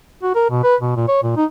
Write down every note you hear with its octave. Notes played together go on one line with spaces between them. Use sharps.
F#4
A#4
B2
B4
B2
A#2
C#5
A#2
D#4